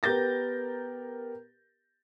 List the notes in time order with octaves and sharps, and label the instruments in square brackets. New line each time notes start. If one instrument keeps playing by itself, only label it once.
[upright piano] B3 G4 A#4 G6 A6 A#6